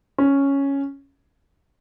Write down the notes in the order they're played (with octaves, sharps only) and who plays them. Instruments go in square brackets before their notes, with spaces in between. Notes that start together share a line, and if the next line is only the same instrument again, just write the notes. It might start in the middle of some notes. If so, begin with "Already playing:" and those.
[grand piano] C#4